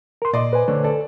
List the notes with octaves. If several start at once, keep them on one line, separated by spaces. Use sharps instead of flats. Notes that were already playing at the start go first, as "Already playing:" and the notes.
A#4 C6
A#2 D5 D#5 C6
B4 C5 G#5
D3 A3 C#5 D5
A4 D5